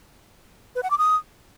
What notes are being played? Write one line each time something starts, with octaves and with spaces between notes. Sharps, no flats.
B4
F#5
D6
D#6